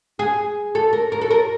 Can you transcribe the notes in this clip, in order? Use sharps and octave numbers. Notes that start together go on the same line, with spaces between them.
G#4
A4
A#4
A#4
A4
A#4